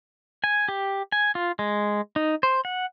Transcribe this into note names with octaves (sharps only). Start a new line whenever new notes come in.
G#5
G4
G#5
F4
G#3
D#4
C5
F#5